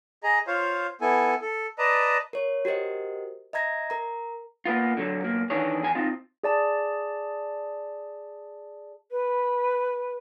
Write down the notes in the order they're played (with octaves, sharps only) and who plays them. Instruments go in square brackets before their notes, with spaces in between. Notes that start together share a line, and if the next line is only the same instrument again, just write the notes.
[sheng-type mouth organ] G#4 D#5 A#5
F4 C5 C#5 F5
B3 E4 A4 G#5
A4
B4 D5 D#5 A5 A#5
[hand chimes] A#4 C#5
F#4 G4 A#4 C5 D#5
D#5 E5 A#5 G#6 A#6
A#4 A#5
[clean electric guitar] A#3 B3 F4
D3 F#3
B1 A#3
D#3 E3 D4 G#4 C#5
E2 G#4 G#5
C4 D#4 F4
[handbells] G#4 D5 A5
[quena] B4